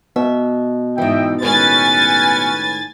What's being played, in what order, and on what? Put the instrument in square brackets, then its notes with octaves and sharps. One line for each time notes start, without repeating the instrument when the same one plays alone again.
[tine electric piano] B2 [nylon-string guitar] E5
[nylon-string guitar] G#2 E3 [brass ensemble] D#5 E5 G5
[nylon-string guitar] A2 D#3 G#3 [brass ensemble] C#4 B4 [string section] G#5 A6